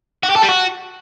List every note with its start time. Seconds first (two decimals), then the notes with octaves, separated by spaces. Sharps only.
0.23 F#4
0.30 G4
0.36 A4
0.42 G3
0.49 F#4